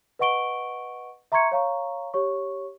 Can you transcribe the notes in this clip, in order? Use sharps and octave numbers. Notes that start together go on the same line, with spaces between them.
B4 D#5 F#5 C#6 D7 G7
E5 A#5 C6 C#6 G#6 C#7
C#5 F5 A#5 C#6
G4 C#5 C#6